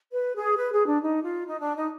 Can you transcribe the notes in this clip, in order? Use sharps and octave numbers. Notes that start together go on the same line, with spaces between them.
B4
G#4
B4
G#4
D4
D#4
F4
D#4
D4
D#4